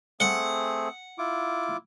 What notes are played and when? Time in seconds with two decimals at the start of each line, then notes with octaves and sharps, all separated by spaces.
0.20 A3 C4 G#4 F#5
1.18 E4 F4 D6